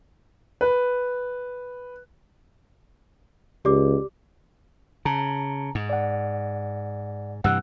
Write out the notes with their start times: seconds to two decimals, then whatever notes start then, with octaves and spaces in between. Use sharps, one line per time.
0.61 B4
3.65 C#2 G4 D5 D6
5.05 C#3 A5 A#5
5.75 G#2
5.90 D5 F#5
7.44 G2 C3 E3 F#5 E6 F#6